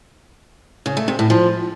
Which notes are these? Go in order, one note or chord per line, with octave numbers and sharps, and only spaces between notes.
C#3
A3
C3
A2
F3